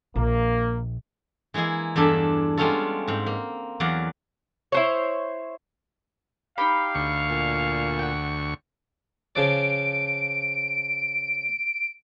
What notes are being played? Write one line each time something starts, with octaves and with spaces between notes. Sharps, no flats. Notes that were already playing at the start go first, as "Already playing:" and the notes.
A#1 A#3
E3 G#3 A#3 E4 G#4
E2 G2 D4 A4 E5
G3 G#3 B3 C#4 F4 A4
G#2 C4
A#3
E2 F#3 D5 F5 F#5
E4 C5 C#5
D#4 G4 F5 G5 B5
D2 C#6
A#2
F#5 G5
C#3 F3 D5 D7